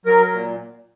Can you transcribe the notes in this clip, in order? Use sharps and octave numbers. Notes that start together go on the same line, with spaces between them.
F#3 A#4
A#2